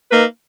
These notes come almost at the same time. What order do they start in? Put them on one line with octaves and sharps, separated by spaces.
B4 A#3 D#4